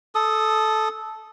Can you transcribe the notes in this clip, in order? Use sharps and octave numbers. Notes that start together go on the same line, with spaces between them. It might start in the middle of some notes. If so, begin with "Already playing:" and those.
A4 D#6